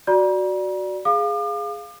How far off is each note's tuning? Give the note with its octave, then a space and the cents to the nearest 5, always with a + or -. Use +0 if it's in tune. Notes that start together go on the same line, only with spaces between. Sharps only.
F#4 +0 D5 +0 A#5 +40
G#4 +0 F5 +0 D6 +45